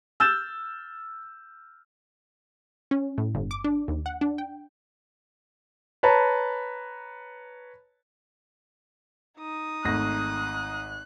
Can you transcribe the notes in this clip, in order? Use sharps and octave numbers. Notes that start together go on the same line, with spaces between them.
E6 F6 G6 A6 E7
C#4
A2
G1
D6
D4
D#2
F#5
D4
G5
B4 C#5 A5 A#5
D#4 D#6
G#1 A3 F#6 A#6